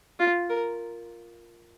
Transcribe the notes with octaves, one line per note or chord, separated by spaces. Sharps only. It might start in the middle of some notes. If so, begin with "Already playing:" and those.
F4
A#4